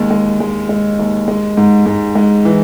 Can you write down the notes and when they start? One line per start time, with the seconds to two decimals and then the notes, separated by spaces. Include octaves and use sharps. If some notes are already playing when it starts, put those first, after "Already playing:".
Already playing: D#2 G#3
0.11 G#3
0.40 G#3
0.69 G#3
0.99 D#2
1.28 G#3
1.57 G#2
1.86 G#2
2.15 G#3
2.45 E3